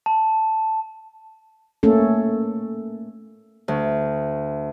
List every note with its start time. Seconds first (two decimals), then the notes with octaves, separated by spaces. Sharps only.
0.06 A5
1.83 A3 A#3 C#4 A4
3.68 D2